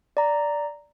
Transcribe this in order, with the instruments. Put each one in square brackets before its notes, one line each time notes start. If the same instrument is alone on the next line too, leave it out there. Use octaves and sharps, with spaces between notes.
[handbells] D5 A#5